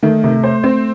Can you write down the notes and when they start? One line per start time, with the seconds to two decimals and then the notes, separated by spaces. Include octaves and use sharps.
0.03 D#3 A3
0.24 C3
0.43 C5
0.64 C4